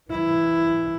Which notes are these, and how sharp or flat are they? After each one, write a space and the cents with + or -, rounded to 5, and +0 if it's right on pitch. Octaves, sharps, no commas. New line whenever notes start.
E3 +5 E4 +10